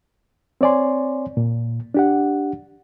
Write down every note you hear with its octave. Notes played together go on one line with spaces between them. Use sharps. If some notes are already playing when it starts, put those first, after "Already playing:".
C4 C#5 D5 G#5 C6
A#2
D4 G4 F#5